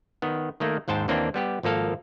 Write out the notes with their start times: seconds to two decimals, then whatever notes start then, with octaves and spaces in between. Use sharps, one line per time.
0.22 D#3 B3
0.60 D#3 A3 A#3
0.88 D#2 G#2 C5 G5 A5
1.08 D#2 E3 A#3 C4 D4
1.34 G3 B3 G4
1.63 G#1 F3 A#3 A4 F5